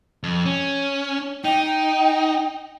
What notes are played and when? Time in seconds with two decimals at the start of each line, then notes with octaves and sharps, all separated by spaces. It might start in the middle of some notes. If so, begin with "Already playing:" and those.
0.23 F2
0.46 C#4
1.45 D#4 G5